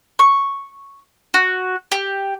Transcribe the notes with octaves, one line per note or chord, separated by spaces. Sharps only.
C#6
F#4
G4